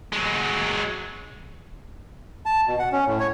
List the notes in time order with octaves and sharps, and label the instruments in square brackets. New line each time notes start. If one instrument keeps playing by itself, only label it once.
[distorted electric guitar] F#3 G#3
[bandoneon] A5
B2
F#5
C#4
A2
C#5